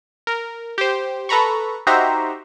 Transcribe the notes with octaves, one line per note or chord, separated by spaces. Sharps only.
A#4
G4 C5
A4 B4 A#5 B5 C#6
D#4 F#4 G4 C5 E5 A#5